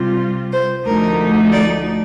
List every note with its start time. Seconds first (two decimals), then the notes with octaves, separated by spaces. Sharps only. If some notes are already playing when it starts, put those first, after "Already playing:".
Already playing: C3 G3 C4 F4
0.53 C5
0.86 D2 D3 F3 A3 D#4 A#4
1.52 D5